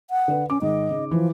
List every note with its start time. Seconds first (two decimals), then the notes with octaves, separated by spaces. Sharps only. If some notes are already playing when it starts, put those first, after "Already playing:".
0.10 F#5
0.28 D3 B4
0.50 C#4 D6
0.62 G#2 D#3 D#5
0.91 C#3 D#4
1.11 E3 F3